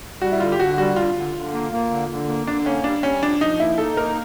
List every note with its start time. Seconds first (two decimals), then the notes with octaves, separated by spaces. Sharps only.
0.22 G3 F#4
0.32 E4
0.40 D3 F4
0.52 G4
0.60 D3 F#4
0.78 G3 F#4
0.96 D3 F4
1.15 D3
1.35 D3
1.53 A#3
1.72 A#3
1.90 D3
2.09 D3
2.28 A#3
2.47 D3 D4
2.66 A#3 C#4
2.84 G3 D4
3.03 G3 C#4
3.22 F3 D4
3.40 F3 D#4
3.59 A#3 E4
3.78 D#4 A4
3.97 A#3 A#4